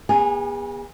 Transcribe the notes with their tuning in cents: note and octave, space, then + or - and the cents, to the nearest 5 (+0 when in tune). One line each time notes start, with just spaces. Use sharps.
B3 -35 G#4 -40 G#5 +0